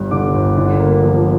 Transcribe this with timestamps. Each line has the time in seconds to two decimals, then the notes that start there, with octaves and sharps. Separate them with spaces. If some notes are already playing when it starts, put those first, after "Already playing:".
Already playing: G1 G2
0.11 D3 D6
0.34 G1
0.57 D3
0.79 A#3
1.03 F3